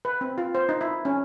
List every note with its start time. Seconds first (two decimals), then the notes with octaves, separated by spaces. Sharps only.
0.05 B4
0.21 C4
0.38 F4
0.55 C5
0.69 D#4
0.81 E4
1.05 C#4